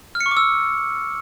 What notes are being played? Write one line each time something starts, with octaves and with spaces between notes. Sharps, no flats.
F6
C#7
C#6
D6
E6